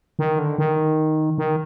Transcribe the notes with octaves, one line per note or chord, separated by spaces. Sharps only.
D#3
D3
D#3
D#3